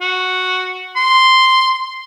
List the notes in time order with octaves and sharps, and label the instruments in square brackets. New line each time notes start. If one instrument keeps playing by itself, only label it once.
[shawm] F#4
C6